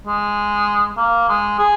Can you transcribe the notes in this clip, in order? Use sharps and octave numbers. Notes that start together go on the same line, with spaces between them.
G#3
A#3
G#3
G#4